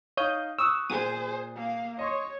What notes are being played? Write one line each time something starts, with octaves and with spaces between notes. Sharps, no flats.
D#4 C#5 F5 D#6 G6
C#6 D#6 E6 F#6
A#2 G#4 C5 D#7
A#3 F5
C#5 D#5 C6 C#6